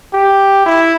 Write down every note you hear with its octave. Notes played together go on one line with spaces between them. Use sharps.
G4
E4